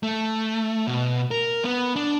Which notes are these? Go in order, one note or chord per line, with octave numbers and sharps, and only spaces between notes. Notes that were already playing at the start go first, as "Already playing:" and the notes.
A3
B2
A#4
B3
D4